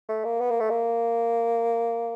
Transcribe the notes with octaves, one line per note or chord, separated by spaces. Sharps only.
A3
A#3
B3
A#3
A3
A#3